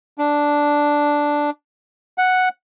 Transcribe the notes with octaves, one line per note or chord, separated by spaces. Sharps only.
D4
F#5